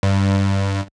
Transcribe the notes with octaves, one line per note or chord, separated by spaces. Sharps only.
G2